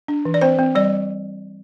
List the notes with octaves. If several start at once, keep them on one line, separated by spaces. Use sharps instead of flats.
D4
E3
D5
C4 C5
C4
G3 D5